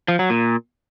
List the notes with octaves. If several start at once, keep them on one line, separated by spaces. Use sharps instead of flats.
F3
F#3
A#2